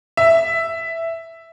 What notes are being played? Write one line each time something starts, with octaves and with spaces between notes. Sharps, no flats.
E5